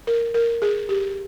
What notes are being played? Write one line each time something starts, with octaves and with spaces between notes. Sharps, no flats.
A#4
A#4
G#4
G4